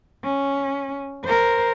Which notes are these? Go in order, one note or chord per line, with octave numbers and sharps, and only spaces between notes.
C#4
A#4 C5